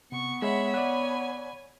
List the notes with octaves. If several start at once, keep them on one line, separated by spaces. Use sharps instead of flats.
C3 B3 C#6
G#3 C#5 E5 F#5 B5
D5 F#5 G#5